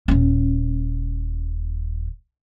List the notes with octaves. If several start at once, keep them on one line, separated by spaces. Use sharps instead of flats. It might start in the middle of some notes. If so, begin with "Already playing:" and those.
D#1 C#4